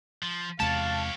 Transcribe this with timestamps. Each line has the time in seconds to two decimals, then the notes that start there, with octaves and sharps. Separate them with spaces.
0.23 F3
0.60 E2 C3 G#3 G4 C#5 F5 A5